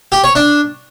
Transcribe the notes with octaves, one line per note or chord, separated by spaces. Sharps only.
G4
C#5
D4